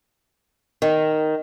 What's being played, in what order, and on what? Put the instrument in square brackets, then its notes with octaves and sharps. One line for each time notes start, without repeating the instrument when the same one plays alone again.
[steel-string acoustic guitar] D#3